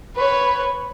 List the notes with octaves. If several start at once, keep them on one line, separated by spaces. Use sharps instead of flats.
B4 C#5